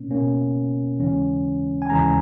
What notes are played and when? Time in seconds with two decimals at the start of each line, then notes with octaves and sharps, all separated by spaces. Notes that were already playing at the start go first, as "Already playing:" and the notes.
Already playing: B2 A#3 C#4
0.11 B2 A#3 C#4
1.00 D#2 C#3 E3 G#3 C#4
1.82 G#5
1.90 D#2 C#3 E3 G#3 C#4 A#5